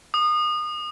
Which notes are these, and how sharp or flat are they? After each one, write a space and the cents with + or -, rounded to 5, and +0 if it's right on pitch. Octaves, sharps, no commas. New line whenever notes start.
D#6 -30